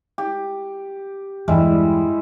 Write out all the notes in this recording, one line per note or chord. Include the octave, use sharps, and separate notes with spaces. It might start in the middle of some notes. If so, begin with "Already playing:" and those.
G4
E2 G2 E3 G3 G#3 E4